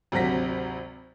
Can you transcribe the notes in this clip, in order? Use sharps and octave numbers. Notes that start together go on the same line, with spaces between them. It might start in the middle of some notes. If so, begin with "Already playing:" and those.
G#1 D2 C3 F#3 A#6 B6